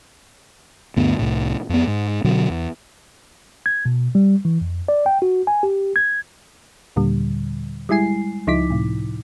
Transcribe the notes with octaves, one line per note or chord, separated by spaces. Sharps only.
D2 G2 B3
C2 A2
F2 B3
G#2
B2 D3 F#3
E2
G#6
B2
G3
E3
F2
D5
G5
F#4
G#5
G4
G#6
D#2 A#2 D3 G3
G3 G#3 E4 G#5 C7
C#2 F3 D#4 E4 D6 B6
A2 C3